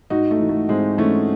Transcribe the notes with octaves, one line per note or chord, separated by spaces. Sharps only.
G#2 D#4 F#4
A3
E3
A3
G#2 G#3 C4
E3 A3 C#4